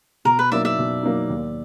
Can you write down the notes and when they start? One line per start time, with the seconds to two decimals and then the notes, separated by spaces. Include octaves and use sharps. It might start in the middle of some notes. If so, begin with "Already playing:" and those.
0.25 B2 A#4
0.39 B4
0.52 F#3 A#3 D#4 D5 E5
0.65 D5 E5
0.78 B2
1.03 F#3 A#3 D#4
1.30 D#2